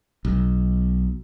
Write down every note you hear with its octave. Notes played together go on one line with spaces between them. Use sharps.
B1